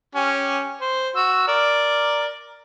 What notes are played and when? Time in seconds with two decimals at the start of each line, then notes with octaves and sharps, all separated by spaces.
0.15 C#4 G4
0.81 C5
1.16 F#4 E6
1.47 A#4 D5